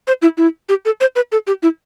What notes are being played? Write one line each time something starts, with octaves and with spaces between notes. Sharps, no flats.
C5
E4
E4
G4
A4
C5
B4
A4
G4
E4